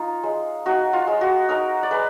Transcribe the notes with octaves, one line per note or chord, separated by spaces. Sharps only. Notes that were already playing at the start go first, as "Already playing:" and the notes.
Already playing: D#4 F4
G#3
D#4 F#4
F4
G#3
F#4
D#4 A#4
D5
G#3 B4